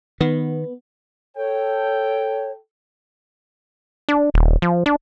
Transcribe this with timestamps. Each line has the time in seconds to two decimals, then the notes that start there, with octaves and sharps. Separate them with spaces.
0.21 D#3 B3
1.36 A4 C#5 G5
4.09 D4
4.34 D#1
4.62 F3
4.86 D4